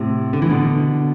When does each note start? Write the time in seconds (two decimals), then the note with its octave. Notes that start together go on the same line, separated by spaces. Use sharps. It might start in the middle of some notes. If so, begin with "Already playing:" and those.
Already playing: A2 C3
0.33 D3
0.42 E3
0.50 B2 D3